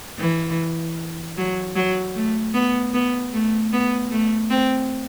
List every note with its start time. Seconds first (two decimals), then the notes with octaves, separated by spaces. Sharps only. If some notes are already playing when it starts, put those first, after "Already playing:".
0.19 E3
1.37 F#3
1.75 F#3
2.15 A3
2.54 B3
2.94 B3
3.33 A3
3.72 B3
4.12 A3
4.50 C4